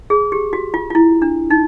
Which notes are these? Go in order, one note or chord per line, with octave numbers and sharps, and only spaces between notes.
G#4
G4
F#4
F4
F4
E4
D4
D#4